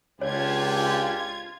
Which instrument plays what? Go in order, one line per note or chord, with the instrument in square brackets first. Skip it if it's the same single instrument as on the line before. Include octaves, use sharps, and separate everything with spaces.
[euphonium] C#2 [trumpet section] C#4 D4 G4 [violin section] F4 G#6 [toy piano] C#5